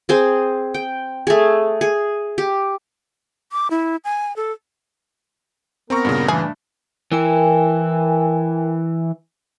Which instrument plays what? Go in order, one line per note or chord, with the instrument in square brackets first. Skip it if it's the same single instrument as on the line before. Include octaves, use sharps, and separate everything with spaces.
[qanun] C4 G#4 C5
G5
A3 G#4
G#4
G4
[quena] D6
E4
G#5
A4
[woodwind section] B3 [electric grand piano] C4 A#5 C#6 [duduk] A#4
[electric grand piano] G2 A#2 C#3
[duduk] E3 [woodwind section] G3 A3 D4 [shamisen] G#4
[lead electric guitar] E3 E4 [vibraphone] A#4 G5 G#5